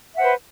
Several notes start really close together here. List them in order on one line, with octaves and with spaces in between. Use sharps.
E5 F#5 C5 B4